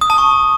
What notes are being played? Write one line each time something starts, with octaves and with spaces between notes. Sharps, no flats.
D#6
A5
C#6